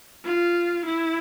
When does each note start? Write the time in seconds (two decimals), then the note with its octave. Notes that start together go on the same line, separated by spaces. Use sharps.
0.25 F4
0.86 E4